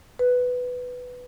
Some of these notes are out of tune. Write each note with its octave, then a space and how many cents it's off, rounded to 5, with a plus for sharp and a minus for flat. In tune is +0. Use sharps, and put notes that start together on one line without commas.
B4 +5